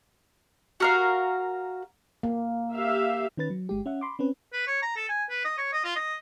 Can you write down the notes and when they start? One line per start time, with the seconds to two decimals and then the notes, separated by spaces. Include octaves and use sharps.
0.80 F#4 A#4 F5
2.23 A#3
2.74 G4 E5 F5
3.37 D#3 C#4 B4 A6
3.50 F#3
3.69 G1 G#3 G4
3.86 C#4 E5 F#5
4.01 B5 C6 D6
4.19 C4 C#4 B4
4.53 B4
4.67 C#5
4.83 A#5
4.96 A4
5.09 G#5
5.30 B4
5.45 D#5
5.58 C#5
5.73 D#5
5.84 F4
5.96 D#5